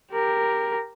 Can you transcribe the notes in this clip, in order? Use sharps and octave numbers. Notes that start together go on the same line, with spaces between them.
G4 A#4